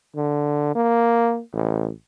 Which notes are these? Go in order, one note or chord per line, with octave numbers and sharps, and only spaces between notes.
D3
A#3
A1